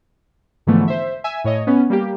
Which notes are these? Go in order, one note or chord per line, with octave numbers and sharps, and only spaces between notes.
G#2 D3 E3 F3 A3 B3
C5 E5
E5 G#5 E6
A2 C#5 D#5
B3 C#4
G3 A#3 G4